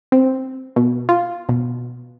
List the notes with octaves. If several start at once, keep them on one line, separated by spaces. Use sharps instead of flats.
C4
B2
F4
B2